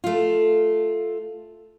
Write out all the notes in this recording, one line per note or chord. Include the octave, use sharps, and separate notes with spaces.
A3 F4